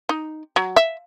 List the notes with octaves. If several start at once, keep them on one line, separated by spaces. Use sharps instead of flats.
D#4
F#3
E5